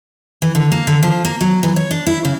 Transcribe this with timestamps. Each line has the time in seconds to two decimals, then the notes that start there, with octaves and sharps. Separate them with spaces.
0.42 E3
0.55 D3
0.72 A#3
0.87 D3
1.03 F3
1.25 A#3
1.41 F#3
1.63 E3
1.76 C#5
1.91 D4
2.07 E4
2.25 C#3